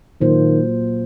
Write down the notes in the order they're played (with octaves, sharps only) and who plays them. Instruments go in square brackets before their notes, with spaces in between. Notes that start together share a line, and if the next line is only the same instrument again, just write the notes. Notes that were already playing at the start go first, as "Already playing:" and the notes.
[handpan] A#2 F#3 A#3 F4 C5 [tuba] D#3